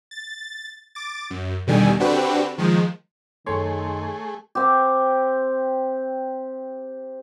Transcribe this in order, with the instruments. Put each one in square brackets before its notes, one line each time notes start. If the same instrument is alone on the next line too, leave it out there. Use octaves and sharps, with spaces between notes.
[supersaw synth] A6
D6 A6
F#2
E2 B2 D3 D#3 G3 G#5
D3 C4 D4 F#4 G4 B4
D#3 F3 G#3
[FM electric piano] F#2 A4 C6 [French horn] D#3 [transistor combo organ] A3 G#4 [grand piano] C#5
[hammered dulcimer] C4 G4